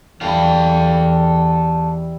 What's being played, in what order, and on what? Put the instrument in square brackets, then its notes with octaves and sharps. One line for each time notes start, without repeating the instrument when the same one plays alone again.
[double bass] E2 [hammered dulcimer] G3 E4 [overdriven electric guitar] A4 F5